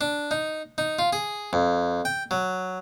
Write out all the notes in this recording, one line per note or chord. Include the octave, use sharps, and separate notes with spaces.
D4
D#4
D#4
F4
G#4
F2
G5
F#3